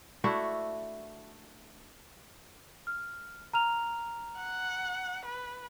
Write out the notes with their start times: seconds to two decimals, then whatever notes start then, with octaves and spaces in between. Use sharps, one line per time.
0.24 A3 D4 E4 F#4
2.87 F6
3.53 A#5 F6 F7
4.37 F#5
5.25 B4